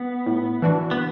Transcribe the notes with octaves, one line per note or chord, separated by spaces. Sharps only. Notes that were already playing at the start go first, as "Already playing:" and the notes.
Already playing: B3
A2
E3 D4 F#4
B3